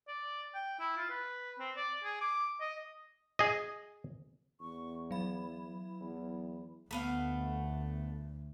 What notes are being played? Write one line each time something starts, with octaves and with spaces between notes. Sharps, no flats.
D5
G5
E4
F4
B4
C4
D5
G#4
D6
D#5
G#4 D#5
E2 C#6
F#3 E4 B5
E2
D2 A3 B3 F5